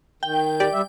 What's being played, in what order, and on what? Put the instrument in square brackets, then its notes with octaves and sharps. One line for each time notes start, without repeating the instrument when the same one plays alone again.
[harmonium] D#3 [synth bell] G5
[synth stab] G4 D5
[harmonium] G3 E5